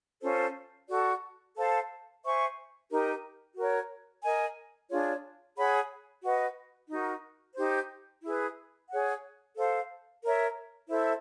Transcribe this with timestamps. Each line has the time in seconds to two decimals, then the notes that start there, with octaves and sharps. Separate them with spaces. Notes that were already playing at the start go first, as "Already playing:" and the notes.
0.22 C#4 F4 A4 C5
0.89 F#4 A4 D5
1.56 A4 C5 F5 A5
2.23 C5 E5 G#5 C#6
2.89 D#4 G4 A#4
3.55 F#4 A#4 C#5
4.22 A#4 D#5 G#5
4.89 D4 F4 G#4 C#5
5.56 G#4 C#5 F#5 B5
6.22 F#4 B4 D#5
6.89 D#4 F#4 A#4
7.56 D#4 G4 C5
8.23 E4 G#4 B4
8.89 G#4 C#5 F#5
9.56 A4 C5 F5
10.23 A#4 C#5 E5
10.89 E4 A4 C5 E5